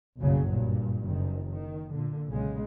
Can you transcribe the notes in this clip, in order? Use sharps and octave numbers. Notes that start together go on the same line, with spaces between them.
F#1 B1 G2 C#3 F#3
G2 A#2
F#1 D#3
D#3
A#2 D3
B1 C#3 G#3